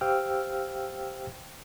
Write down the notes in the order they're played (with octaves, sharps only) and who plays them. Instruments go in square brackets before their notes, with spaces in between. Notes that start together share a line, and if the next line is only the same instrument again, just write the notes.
[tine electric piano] G4 C5 F5 G5 E6 F6